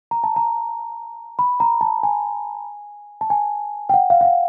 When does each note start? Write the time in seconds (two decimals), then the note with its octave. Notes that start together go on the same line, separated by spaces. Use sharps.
0.11 A#5
0.24 A5
0.36 A#5
1.39 B5
1.60 A#5
1.81 A5
2.03 G#5
3.21 A5
3.30 G#5
3.89 G5
3.94 F#5
4.10 F5
4.21 F5
4.25 F#5